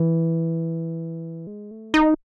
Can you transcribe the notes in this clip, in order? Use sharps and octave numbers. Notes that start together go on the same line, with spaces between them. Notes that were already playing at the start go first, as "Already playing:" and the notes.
Already playing: E3
G#3
A3
D#4